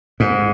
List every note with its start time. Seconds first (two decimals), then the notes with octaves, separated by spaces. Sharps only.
0.20 G#2